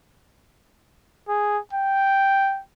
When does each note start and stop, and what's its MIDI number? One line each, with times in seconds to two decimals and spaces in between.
1.29 1.59 68
1.73 2.60 79